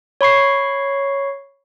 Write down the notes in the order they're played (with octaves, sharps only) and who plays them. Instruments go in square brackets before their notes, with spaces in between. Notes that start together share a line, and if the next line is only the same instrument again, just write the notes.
[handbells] C#5 B5 C#6 C7